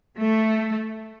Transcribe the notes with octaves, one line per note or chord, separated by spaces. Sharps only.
A3